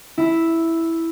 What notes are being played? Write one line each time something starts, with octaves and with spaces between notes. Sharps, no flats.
E4